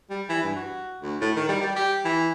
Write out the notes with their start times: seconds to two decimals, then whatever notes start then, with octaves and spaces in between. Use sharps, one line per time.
0.10 G3
0.29 E3
0.43 G2
0.56 F#4
1.02 D2
1.21 A2
1.36 D#3
1.49 G3
1.61 G3
1.76 G4
2.05 E3